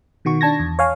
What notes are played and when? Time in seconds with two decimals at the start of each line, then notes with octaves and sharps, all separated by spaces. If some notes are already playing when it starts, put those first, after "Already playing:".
0.25 B2 D#3 F#4 C#6
0.41 D4 A5 G#6 A#6
0.59 E2
0.79 C#5 F5 G#5